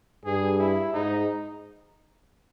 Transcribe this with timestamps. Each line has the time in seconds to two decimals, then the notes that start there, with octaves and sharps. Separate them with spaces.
0.25 G2 G#4
0.59 E4
0.93 G#2 D#4